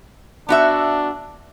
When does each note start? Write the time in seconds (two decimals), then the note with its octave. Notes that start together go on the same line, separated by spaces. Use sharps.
0.49 B3 D4 F#4 E5